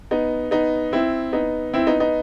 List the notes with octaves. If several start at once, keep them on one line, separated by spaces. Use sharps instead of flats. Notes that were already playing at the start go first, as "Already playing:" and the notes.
B3 D#4
B3 D#4
C4 E4
B3 D#4
C4 E4
B3 D#4
B3 D#4